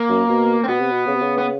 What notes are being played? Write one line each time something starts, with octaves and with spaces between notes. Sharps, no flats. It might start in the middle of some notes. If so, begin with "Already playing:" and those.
Already playing: A#3
F#2
B2
C4
B2 B3
C3
B2
C#3
C3
C#3
B3